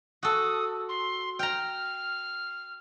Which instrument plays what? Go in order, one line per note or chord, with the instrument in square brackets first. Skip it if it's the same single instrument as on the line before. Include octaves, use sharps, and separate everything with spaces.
[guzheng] F#4 A4 [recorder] D#6
[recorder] C6
[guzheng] G5 A#5 [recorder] F6